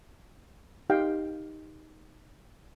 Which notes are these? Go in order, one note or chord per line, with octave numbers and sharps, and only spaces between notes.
D#4 G4 F5 G5